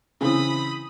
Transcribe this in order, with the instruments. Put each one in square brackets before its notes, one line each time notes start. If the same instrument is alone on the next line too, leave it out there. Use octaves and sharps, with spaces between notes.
[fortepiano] C#3 E3 C4 [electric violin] B5 D#6